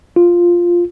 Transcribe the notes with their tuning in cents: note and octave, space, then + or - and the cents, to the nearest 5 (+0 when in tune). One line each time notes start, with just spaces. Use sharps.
F4 +0